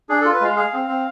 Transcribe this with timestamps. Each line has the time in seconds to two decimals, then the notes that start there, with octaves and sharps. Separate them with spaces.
0.09 D4 G#4
0.21 F4 A4
0.33 B4
0.41 G#3 F5
0.56 G#4 F5
0.73 C4
0.88 C4